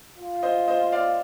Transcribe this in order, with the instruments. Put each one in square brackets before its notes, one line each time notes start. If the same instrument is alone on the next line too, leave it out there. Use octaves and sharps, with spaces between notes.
[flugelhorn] F4
[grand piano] C5 D#5
C5 D#5
D5 F5